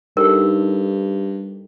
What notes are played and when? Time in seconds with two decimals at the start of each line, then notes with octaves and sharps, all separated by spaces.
0.17 G2 D#4 G4 A4 A#4